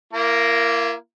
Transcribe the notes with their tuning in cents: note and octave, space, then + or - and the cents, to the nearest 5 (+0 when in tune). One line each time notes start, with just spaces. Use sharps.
A#3 +0 E4 +40 A#4 +0